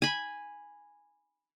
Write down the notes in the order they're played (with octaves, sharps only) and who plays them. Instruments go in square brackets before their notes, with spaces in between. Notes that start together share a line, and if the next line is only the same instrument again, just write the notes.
[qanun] G#5 B5